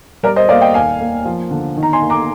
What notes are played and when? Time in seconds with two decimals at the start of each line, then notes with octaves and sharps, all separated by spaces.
0.23 G3 A#4 D5
0.36 C5 D#5
0.49 A#3 D5 F5
0.61 D#5 G5
0.74 D#2 F5 G#5
1.00 A#3
1.25 F3
1.51 D3
1.77 D#3
1.83 A#5
1.93 G#5 C6
2.02 A#3
2.10 A#5 D6